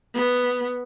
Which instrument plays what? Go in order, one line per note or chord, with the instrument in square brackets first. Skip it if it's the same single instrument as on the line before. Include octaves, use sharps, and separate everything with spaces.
[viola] B3